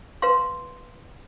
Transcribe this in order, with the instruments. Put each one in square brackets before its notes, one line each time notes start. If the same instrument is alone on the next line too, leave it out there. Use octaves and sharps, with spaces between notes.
[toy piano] B4 F5 C6